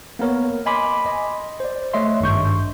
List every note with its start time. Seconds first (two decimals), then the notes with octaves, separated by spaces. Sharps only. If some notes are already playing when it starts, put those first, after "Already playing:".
0.19 A#3 B3 A#4 C#5
0.66 D#5 G#5 B5 C6 D6
1.06 D#5
1.60 C5 D5
1.93 A3 C#5 D#5 E5 C6
2.21 G#1 G2 C#6 G6